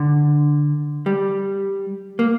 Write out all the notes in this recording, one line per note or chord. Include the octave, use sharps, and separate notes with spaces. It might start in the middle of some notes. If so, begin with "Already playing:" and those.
Already playing: D3
G3
A#3